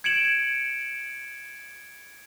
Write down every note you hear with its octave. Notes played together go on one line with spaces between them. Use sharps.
G#6 C#7 D7 E7 F#7